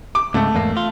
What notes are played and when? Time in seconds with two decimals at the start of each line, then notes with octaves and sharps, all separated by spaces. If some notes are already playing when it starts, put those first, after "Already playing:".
0.15 D6
0.34 C#2 G#2 C#3 A3
0.55 E2 G#2 A#3
0.77 F4